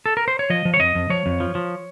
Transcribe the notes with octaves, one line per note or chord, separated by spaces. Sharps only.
A4
A#4
C5
C#5
F3 D#5
F3
C#5
F2 D#5
F2
F3 C#5
F2
F3
F3